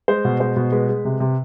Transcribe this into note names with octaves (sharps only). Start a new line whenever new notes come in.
G#3 C5
B2
G#3 C5
B2
G#3 B4
G#3
C3
C3